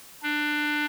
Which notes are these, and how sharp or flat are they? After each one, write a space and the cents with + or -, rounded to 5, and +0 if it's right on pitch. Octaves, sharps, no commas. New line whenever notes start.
D4 +20